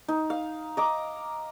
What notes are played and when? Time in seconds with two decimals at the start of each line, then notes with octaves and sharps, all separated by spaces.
0.08 D#4
0.30 F5
0.77 D#5 A#5 D6